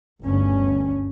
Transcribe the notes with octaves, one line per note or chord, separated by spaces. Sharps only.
G1 D2 G2 C#4